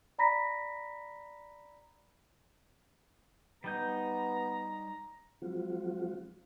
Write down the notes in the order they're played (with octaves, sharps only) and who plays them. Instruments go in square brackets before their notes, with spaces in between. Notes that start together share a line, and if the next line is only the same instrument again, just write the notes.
[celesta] D5 A#5 B5 A#6 B6
[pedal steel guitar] G3 D#4 G6 [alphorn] B3 [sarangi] A#5
[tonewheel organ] F3 F#3 G#3 C4 F4 F#4